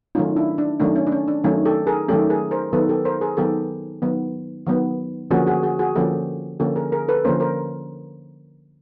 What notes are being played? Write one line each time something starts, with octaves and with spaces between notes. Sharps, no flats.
D#3 F#3 A3 C#4 D#4 F4
D4 E4
D4
D#3 F#3 A3 C#4 D4
C#4
D4
C#4
D4
D#3 F#3 A3 C#4 D#4
G4 A4
G#4 A#4
D#3 F#3 A3 C#4 G4 A4
G#4 A#4
A#4 C5
D#3 F#3 B3 A4 B4
G4 A4
A#4 C5
G#4 A#4
D#3 F#3 B3 G4 A4
D#3 F#3 B3
D#3 F#3 B3
D3 F3 A#3 C#4 F#4 G#4
F#4 G#4
F#4 G#4
F#4 G#4
D3 F3 A#3 C#4 G4 A4
D3 F3 A#3 C#4 G4 A4
G#4 A#4
G#4 A#4
A4 B4
D3 F3 A#3 C#4 A#4 C5
A#4 C5